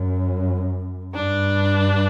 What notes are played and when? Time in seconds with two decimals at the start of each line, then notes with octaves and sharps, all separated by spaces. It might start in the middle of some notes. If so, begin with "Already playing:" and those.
Already playing: F#2
1.14 G2 D4